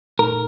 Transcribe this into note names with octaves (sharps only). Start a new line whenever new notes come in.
A#2 A3 D#4 A4 A#4